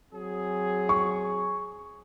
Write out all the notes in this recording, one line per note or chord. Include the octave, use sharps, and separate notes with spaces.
F#3 C4 G#4
C#6